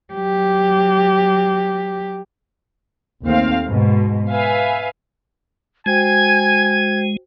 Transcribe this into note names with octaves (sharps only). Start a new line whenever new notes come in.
F#3 G4
D#2 A3 C4 F5
G#2 B2
B4 E5 F5 G#5
G#3 F#4 C5 G5 G#5 G#6